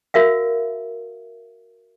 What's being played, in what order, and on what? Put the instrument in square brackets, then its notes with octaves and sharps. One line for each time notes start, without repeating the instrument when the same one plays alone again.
[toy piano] F#4 A#4 E5 F5